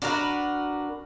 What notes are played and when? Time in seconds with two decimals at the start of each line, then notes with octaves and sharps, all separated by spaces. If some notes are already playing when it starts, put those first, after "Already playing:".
0.02 D4 F#4 A#4 B4